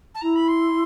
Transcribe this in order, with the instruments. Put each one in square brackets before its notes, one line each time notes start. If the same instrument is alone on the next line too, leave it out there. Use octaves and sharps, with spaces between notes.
[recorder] A5
[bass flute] E4 [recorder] A#5
[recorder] B5
C6